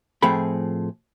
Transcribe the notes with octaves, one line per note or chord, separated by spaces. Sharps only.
A2 F3 A3 C4 G#4 B5